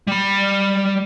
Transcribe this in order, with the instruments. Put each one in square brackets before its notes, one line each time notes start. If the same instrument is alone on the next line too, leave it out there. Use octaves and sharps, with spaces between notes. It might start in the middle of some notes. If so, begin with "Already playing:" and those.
[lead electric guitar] G3 B5